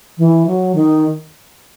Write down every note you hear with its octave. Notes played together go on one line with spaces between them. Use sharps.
E3
F#3
D#3